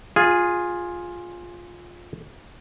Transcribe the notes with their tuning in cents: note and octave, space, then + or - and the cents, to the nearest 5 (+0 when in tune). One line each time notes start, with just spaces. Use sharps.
F4 +10 G#4 -5